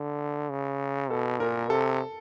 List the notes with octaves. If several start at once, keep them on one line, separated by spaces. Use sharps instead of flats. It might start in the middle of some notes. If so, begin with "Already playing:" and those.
Already playing: D3
C#3
B2 A4
A#2 A#4
C3 A4